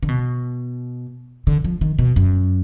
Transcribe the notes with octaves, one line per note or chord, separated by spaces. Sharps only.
D3
B2
D3
F3
D#3
B2
F#2